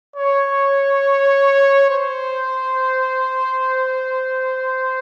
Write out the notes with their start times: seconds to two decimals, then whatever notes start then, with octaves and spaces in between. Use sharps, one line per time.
0.16 C#5
1.90 C5